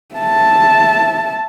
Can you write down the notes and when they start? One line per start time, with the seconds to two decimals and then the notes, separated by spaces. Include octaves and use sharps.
0.15 E5 A5